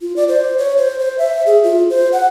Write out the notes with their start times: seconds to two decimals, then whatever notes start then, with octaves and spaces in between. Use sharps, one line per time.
0.01 F4
0.16 D5
0.28 C5
0.58 C#5
0.78 C5
0.99 C5
1.18 E5
1.46 G#4
1.64 F4
1.90 C5
2.13 F#5